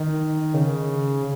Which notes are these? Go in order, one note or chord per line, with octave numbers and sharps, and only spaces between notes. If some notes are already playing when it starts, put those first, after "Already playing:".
Already playing: D#3
C#3